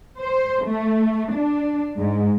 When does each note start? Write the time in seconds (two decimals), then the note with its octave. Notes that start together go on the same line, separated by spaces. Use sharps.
0.21 C5
0.66 A3
1.35 D4
1.97 G#2